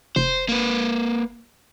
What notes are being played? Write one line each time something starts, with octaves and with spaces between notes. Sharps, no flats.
F1 C5
A#3 B4